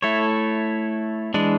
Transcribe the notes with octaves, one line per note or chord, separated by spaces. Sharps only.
A3 E4 A4 C#5
E3 G#3 D4